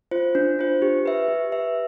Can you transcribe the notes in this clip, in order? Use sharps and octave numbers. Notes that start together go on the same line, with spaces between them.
F4 C5
D4
F4 C5
G4
B4 E5
G4
B4 E5